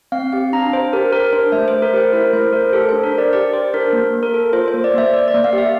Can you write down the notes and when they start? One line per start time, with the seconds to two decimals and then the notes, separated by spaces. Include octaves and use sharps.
0.12 C4 F5
0.33 G4 F5
0.53 D4 A#5
0.72 D4 C5
0.93 G4 A#4
1.13 G4 A#4
1.33 D4 C5
1.52 A3 E5
1.68 C5
1.74 A3
1.82 A#4
1.94 G4 C5
2.13 E4 A#4
2.33 A3 C5
2.53 A3 A#4
2.73 G4 A4
2.89 D4 C5
3.03 A#4
3.13 D4
3.18 D5
3.33 G4 D5
3.53 G4 C5
3.74 D4 A#4
3.93 A#3
4.13 A#3
4.23 A#4
4.34 A4
4.53 F4 C5
4.68 C5
4.74 A#3
4.84 D5
4.94 A#3 E5
5.14 A#3 D5
5.28 D5
5.34 A#3
5.44 F5
5.53 G4 E5